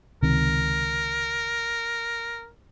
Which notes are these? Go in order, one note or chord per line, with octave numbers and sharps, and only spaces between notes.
C#2 C3 D#3 A#4